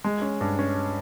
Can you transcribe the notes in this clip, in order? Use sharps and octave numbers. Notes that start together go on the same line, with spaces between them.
G#3
C#4
G2
C#4